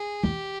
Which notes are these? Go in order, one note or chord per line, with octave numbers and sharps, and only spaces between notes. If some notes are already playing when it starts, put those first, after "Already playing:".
Already playing: G#4
E2 G4